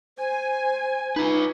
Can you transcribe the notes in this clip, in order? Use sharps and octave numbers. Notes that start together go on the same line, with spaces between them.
C5 G#5
D#4 F4 B4